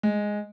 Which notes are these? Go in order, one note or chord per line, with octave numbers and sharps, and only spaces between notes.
G#3